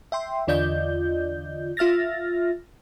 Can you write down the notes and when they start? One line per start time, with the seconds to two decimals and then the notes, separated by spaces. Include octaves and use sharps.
0.12 E5 G5 C6
0.47 E2 D3 F4 D5 D#5 G6
1.77 F4 E5 F6 A6 A#6